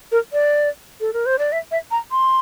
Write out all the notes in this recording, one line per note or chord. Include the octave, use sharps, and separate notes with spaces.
A#4
D5
A4
A#4
C5
D5
E5
E5
A#5
C6